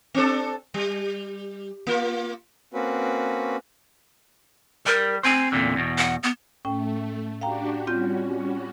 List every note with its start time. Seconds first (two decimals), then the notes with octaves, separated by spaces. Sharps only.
0.15 C4 D4 A4
0.74 G3
1.87 A#3 F4
2.73 A#3 C4 C#4 F#4 B4
4.86 G3 A#4
5.23 C4 C5 G#5
5.52 E2 A#2 D3
5.76 E2 B2
5.98 F#5
6.23 B3
6.65 A2 A3 C#4 G5
7.41 D4 F#4 G4 F5 G5 A#5
7.87 G3 C4 C#4 F4 F#4 G6